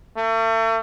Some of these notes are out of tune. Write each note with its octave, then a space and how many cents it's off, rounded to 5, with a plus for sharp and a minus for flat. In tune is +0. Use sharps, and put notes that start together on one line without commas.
A3 +40